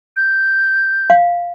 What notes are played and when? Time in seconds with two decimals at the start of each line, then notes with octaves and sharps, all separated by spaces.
0.17 G6
1.10 F5